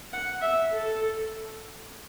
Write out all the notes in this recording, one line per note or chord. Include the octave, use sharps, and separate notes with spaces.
F#5
E5
A4